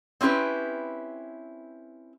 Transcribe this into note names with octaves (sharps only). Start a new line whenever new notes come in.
C4 C#4 E4 G4 B4